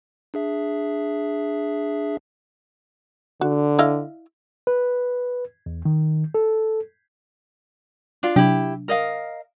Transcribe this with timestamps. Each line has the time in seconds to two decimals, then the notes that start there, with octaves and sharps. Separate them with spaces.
0.34 D4 G#4 E5
3.41 D3 F#4
3.79 E4 D#5 F5
4.67 B4
5.66 E2
5.85 D#3
6.34 A4
8.23 D4 F4
8.36 C3 F#3 D4 E4 G4
8.88 A#4 D#5 F5